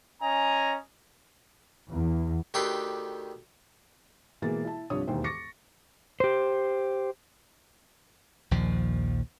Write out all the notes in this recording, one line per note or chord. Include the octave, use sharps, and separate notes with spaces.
C#4 D#5 G#5 A#5
E2
D2 D#3 G4 A4 B4 C6
B2 E3 G#3 A#3 A6
E4 A5
C2 G2 F3 D4 C#5 D#6
E1 D#2 D#3 E3 C5 G5
C#6 D6 A6 A#6 C#7
G4 C5
A#1 D#2 F3